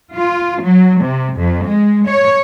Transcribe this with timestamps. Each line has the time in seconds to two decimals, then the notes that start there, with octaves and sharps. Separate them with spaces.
0.15 F4
0.63 F#3
1.02 C3
1.37 F2
1.67 G#3
2.07 C#5